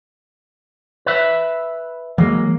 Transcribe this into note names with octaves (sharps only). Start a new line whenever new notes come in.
B4 E5
E3 F#3 G#3 A#3